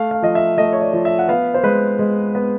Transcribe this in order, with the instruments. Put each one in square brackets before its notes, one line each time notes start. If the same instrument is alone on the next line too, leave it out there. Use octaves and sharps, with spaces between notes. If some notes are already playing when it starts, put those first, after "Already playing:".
Already playing: [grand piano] A3 F5
F5
F3 D#5
E5
A3 D#5
C#5
D5
F3
E5
F#5
B3 F5
C5
G#3 B4
G#3
B3